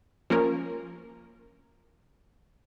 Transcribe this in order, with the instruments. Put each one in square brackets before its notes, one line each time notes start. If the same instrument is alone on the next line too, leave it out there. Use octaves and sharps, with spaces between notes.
[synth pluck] F3 A#3 C#4 A#4